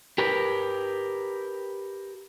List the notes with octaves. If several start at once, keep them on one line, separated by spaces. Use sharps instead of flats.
G4 A#4 B4